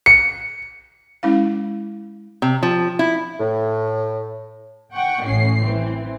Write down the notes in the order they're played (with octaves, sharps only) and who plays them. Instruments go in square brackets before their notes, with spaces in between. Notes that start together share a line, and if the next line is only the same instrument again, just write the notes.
[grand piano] C#7
[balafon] G#3 C#4 E4 F5
[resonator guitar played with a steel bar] C3
F3
E4
[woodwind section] A2
[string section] F#5 G5 C#6
A1 A2 C#4 C7
E3 C4